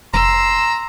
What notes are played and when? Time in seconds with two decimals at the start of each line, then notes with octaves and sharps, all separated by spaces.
0.14 F1 A#5 C6 E6